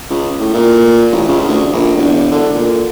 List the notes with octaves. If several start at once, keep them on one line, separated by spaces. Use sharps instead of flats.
C#2
A2
A#2
A1
C#2
D2
A#1
E1
D3
A#2